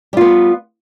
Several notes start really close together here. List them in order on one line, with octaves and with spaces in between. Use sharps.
G3 F4 B3